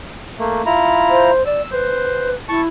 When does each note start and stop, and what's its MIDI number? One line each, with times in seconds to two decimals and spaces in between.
0.39 0.62 57
0.39 0.62 58
0.66 1.30 64
0.66 1.30 65
0.66 1.30 82
1.10 1.45 72
1.46 1.62 74
1.46 1.70 88
1.71 2.34 71
1.71 2.29 72
2.49 2.68 64
2.49 2.61 81
2.49 2.61 85